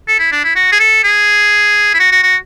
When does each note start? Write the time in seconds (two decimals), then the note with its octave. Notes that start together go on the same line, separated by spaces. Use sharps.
0.08 A4
0.19 E4
0.32 D4
0.44 E4
0.56 F#4
0.72 G#4
0.80 A4
1.04 G#4
1.94 E4
2.00 F#4
2.12 F#4
2.23 F#4